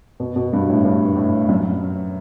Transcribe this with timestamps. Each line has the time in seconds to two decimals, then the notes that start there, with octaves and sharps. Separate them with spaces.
0.20 B2
0.36 B2
0.53 G2
0.69 A2
0.85 G2
1.16 A2
1.49 F#2